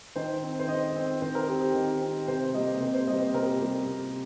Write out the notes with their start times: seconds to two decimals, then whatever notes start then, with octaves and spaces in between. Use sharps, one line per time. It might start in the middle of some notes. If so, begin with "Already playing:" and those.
0.16 D#3 C5
0.42 C4
0.60 C5
0.68 D#3 D#5
0.96 C4
1.22 D#3 C5
1.35 A#4
1.48 C4 G4
1.61 G4
1.74 D#3
2.01 C4
2.28 C3 C5
2.54 G3 A#3 D#5
2.80 C3 C5
2.94 C5
3.07 G3 A#3 D#5
3.21 C5
3.34 C3 A#4
3.43 G4
3.51 A#4
3.61 G3 A#3
3.87 C3